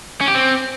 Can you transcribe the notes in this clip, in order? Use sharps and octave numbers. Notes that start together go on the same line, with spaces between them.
C#4
G4
C4